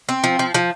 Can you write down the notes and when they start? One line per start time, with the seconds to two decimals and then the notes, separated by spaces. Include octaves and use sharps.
0.09 C4
0.24 F3
0.39 F3
0.54 F3